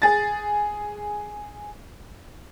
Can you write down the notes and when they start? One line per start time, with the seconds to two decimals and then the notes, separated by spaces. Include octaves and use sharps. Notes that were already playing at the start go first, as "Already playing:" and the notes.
0.02 G#4 A6